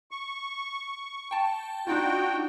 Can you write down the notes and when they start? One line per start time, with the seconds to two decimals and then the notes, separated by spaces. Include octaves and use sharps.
0.11 C#6
1.31 G5 A5
1.87 D4 D#4 F4 F#4 G5